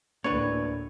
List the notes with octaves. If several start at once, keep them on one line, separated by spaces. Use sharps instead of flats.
D2 A2 A#3 D4 B4 C#5